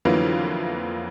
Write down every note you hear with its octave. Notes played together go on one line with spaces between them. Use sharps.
F2 D3 E3 F#3 A#3 B3